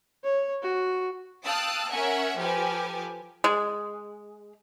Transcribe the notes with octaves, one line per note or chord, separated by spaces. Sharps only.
C#5
F#4
F5 G5 A5 D#6 E6 F#6
C#4 A#4 E5 F#5 G#5
F3 G4 A4 B4 G#5
G#3